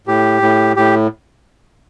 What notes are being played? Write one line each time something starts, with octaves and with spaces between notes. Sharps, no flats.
A2 G4
A2
A2 G4